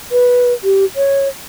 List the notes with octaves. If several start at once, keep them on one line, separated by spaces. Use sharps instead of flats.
B4
G4
C#5